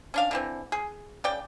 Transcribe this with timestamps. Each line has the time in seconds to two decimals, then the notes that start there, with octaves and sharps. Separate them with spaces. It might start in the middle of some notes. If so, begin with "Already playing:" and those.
0.14 C#4 D4 F5
0.31 D3 E3 C4
0.72 G#4
1.24 C#3 D5 G5